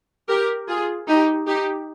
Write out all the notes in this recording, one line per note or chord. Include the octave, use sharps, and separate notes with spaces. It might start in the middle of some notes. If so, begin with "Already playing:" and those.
G4 A#4
F4 G#4
D#4 G4
D#4 G4